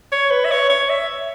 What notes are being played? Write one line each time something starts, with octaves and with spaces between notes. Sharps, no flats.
C#5
B4
E5
C#5
C#5
E5